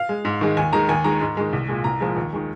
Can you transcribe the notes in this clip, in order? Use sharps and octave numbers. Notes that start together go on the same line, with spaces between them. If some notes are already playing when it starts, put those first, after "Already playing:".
Already playing: F5
G#3
G#2
D#3 G#3
D#2 G#5
D#3 G#3 A#5
D#2 G#5
D#3 G#3 A#5
G#2
D#3 G#3
C2
A#2 G#3
C2 A#5
A#2 F3 G#3
D#2
D#3 G#3